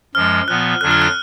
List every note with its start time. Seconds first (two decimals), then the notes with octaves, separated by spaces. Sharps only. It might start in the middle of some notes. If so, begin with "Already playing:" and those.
0.15 F#2 F3 G#3 F6
0.48 A#2 F3 B3 F#6
0.81 F2 D3 F#3 D4 F4 F#6
0.91 F6
1.02 F#6